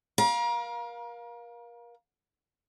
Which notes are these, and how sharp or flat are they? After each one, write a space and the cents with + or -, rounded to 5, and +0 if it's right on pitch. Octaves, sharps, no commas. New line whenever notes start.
A#4 +35 F5 +10 A#5 +40